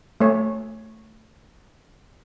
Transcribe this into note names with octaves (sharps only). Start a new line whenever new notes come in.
A3 C#5